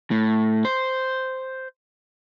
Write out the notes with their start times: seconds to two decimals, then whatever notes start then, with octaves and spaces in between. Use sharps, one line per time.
0.11 A2
0.65 C5